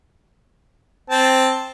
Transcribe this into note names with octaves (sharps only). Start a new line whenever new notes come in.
C4 A5